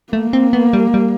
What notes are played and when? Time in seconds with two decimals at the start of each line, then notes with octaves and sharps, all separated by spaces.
0.13 A3 A#3
0.33 C4
0.53 B3
0.73 G3
0.94 G3